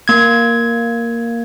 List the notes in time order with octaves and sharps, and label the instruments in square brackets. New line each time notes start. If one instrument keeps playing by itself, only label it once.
[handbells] A#3 G#6